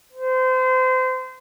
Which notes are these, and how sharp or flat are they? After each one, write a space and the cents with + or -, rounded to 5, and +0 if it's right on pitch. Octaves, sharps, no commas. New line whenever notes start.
C5 -30